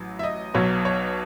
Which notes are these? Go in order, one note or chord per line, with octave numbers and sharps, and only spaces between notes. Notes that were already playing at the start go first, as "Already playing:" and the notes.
Already playing: A1 F#3
E5
D#5
B1 B2 F#3 C#5
C#5